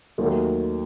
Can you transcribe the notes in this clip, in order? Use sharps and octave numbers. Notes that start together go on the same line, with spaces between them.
D#2 D#3 F#3 A3